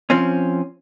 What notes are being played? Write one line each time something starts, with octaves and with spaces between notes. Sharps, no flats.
F3 C4 C#4